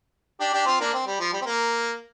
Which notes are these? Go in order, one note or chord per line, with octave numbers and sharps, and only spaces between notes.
D4 G4
D4 G4
C4 F4
A#3 D4
C4
G3
F3
G3
C4
A#3